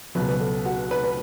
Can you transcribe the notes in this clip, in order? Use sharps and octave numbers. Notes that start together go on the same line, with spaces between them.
C#2 B2 F#3 B4
B4
A4
F#4
B4
B4